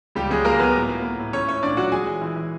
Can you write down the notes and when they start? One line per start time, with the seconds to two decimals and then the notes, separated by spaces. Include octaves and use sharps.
0.15 C#2 G3 G4
0.30 F#3 G#3 G#4
0.45 C#2 A#3 A#4
0.59 F#3 B3 B4
0.75 A2
0.89 A#3
1.04 A#3
1.19 A2
1.33 A3 C#4 C#5
1.48 A3 C#4 C#5
1.63 A#2 D4 D5
1.77 F#3 F#4 F#5
1.92 G#3 G#4 G#5
2.07 E3
2.21 E3
2.36 E3